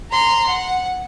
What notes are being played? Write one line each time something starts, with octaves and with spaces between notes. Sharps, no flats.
A#5 C6
F#5